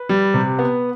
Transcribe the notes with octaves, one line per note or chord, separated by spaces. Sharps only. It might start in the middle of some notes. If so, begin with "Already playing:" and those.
Already playing: B4
G3
C3
B3